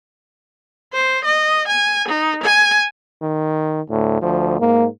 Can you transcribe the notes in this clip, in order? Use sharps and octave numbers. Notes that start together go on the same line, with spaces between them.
C5
D#5
G#5
D#4
G#5
D#3
D2 A2
D2 F3
G#2 A#3